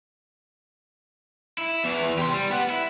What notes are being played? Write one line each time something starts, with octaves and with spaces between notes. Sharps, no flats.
E4
E2 E3
G4 C6
G3
B3 F#5
E4